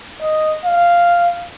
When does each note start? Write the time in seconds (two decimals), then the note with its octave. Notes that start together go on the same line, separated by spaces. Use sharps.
0.22 D#5
0.65 F5